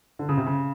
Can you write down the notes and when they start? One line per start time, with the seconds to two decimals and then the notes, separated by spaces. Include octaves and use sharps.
0.19 D3
0.29 C#3
0.37 C3
0.46 C#3